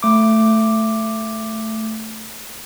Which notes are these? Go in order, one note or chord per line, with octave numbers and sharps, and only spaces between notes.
A3 D6